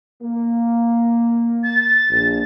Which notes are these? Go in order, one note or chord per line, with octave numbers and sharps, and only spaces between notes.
A#3
A6
A#1